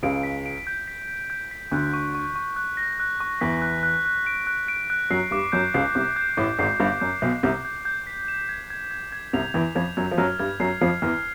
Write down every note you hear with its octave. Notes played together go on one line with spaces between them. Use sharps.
C#2 C#3 D7
B6
D7
G6
B6
B6
G6
B6
D2 D3 F#6
C#6
C#6
C#6
F#6
A#6
F#6
C#6
E2 E3 B6
F#6
F#6
F#6
D7
F#6
D7
F#6
F#2 F#3 C7
G2 G3 D6
F#2 F#3 G6
C#2 C#3 C7
C2 C3 D6
G6
A1 A2 D6
G#1 G#2 C7
G1 G2 G6
F#2 G6
B1 B2 G6
C2 C3 G6
G6
G6
B6
E7
G#6
G#6
G#6
G#6
C2 C3 F7
E2 E3 G#6
F2 F3 G#6
F#2 F#3 G#6
F3
F#2 F#3 F6
G2 G3 G#6
F#2 F#3 C7
F2 F3 C7
E2 E3 F6